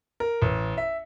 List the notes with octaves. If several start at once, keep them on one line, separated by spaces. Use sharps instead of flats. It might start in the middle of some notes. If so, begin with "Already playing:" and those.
A#4
A1
E5